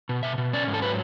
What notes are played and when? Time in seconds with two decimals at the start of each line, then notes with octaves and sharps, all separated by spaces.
0.09 B2
0.23 B2 E5
0.38 B2
0.53 C#4 D5
0.67 G#2
0.74 A4
0.82 F#3 B4